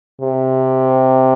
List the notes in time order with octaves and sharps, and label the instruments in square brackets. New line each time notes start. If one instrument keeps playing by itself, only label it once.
[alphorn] C3